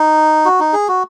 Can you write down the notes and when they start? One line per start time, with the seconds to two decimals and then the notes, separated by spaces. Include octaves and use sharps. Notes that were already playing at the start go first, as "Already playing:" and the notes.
Already playing: D#4
0.45 F#4
0.60 D#4
0.73 G#4
0.88 F#4